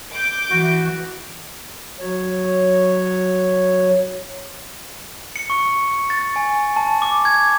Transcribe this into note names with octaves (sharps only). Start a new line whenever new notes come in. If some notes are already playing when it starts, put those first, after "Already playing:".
D6 G6
E3 F#4
F#3 C#5
C#7
C#6
A6
G#5
A5
D6
G#6